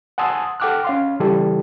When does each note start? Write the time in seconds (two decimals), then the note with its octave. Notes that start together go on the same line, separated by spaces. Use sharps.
0.18 F#5 G#5 A5 C6 D#6 E6
0.60 A4 F#5 G5 D6 F6 F#6
0.85 C#4 F5 C6
1.20 C#3 E3 G3 E4 G4 A4